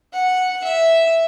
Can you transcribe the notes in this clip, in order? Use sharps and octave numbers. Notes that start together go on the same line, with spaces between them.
F#5
E5